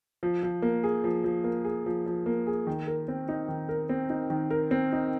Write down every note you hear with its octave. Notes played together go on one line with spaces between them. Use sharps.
F3
F3
A#3
G#4
F3
F3
A#3
G#4
F3
F3
A#3
G#4
D#3
A#4
C4
D#4
D#3
A#4
C4
D#4
D#3
A#4
C4
D#4